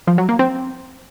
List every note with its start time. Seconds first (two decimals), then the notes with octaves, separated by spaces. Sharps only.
0.07 F3
0.18 F#3
0.29 A#3
0.39 C4